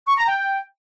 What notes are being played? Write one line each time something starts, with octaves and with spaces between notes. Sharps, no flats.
C#6
A#5
G5